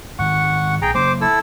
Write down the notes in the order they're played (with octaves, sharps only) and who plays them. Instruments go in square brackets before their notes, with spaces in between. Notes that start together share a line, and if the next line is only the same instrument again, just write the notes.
[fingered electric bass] G#2 D#3 [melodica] F#5 C#6
[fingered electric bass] A#1 [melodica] G#4 G5 A#5
[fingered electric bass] C#3 F#3 A#3 [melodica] C5 D6
[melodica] E4 A4 E6